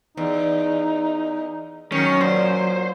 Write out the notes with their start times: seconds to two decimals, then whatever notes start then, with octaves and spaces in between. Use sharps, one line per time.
0.17 E2 D#4
1.92 D#3 F#3 C#4
2.21 A#2 C5